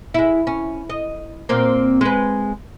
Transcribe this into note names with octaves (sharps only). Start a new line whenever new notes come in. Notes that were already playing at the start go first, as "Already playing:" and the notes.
G#3 E4
C#4
D#5
A#2 A#3 C4
G#3 B4